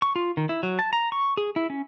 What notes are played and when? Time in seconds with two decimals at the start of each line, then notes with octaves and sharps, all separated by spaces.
0.02 C#6
0.16 F4
0.37 D#3
0.49 E4
0.63 F#3
0.79 A5
0.93 A#5
1.12 C#6
1.37 G#4
1.56 E4
1.70 C#4